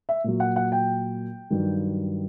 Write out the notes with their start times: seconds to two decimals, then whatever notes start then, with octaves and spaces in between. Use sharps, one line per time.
0.09 E5
0.24 A#2 F#3
0.40 F#5
0.56 F#5
0.72 G5
1.50 G2 D#3 F#3